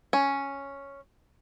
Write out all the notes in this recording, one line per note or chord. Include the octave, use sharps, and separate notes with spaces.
C#4